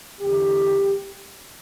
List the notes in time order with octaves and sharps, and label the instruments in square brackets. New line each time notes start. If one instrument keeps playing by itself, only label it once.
[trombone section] E2 D3 A3 G4